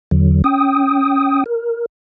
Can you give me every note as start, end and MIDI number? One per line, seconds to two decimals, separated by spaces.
0.11 0.42 40
0.11 0.42 50
0.11 0.42 54
0.44 1.44 61
0.44 1.44 79
0.44 1.44 87
1.46 1.86 70